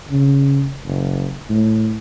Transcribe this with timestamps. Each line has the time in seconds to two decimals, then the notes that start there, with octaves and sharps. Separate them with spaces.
0.10 C#3
0.86 F#1
1.49 A2